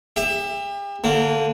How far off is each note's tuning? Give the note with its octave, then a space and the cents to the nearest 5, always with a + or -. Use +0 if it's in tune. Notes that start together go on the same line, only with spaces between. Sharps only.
G4 +40 E5 +10
D3 +0 A#3 -25